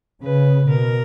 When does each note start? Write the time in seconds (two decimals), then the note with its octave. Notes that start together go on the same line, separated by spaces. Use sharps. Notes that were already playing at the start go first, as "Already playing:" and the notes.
0.22 C#3 B4
0.69 B2 A#4